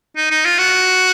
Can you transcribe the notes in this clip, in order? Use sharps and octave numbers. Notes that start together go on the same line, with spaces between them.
D#4
D#4
F4
F#4